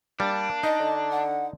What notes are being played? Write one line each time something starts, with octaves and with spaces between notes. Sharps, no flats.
G3 A#3 D4
D#4 D#5
D3
F#5